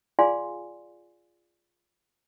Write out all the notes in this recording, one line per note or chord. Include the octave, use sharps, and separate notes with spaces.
F4 G#4 D5 F5 G#5 C6